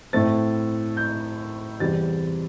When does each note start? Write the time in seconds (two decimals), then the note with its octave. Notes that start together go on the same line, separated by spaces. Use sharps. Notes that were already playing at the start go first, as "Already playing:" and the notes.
0.13 A2 A3 C4 A6
0.97 G6
1.80 E2 C3 G3 A6